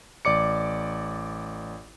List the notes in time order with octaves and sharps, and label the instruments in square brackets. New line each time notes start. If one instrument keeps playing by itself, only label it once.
[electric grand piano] A1 D5 D6 C#7